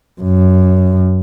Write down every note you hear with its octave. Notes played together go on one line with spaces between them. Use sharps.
F#2